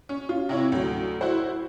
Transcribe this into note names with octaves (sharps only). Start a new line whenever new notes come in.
C#4
F4
C3 E4 C#5
D2 F#3
E4 F#4 C5